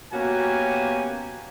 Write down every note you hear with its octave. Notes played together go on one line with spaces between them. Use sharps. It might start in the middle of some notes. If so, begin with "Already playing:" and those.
B2 A#3 C#4 F#4 G4 G#5